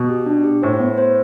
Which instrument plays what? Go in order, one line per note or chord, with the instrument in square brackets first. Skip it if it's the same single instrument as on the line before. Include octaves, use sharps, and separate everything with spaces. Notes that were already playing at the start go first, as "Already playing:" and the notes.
Already playing: [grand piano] B2
[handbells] G4
D4
G4
[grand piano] A2 [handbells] C5
[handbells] B3
C5